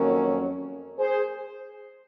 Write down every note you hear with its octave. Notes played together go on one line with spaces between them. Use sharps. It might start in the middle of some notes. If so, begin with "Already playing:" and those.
Already playing: F2 D#3 F#3 A#3 C#4
G#4 C5